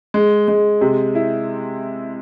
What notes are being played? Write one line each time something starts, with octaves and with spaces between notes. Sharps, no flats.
G#3
G#3
C3
E4